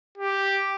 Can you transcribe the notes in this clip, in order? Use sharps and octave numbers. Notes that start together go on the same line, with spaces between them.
G4